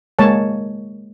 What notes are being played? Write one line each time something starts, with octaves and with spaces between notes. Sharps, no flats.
G#3 A#3 C#5 A5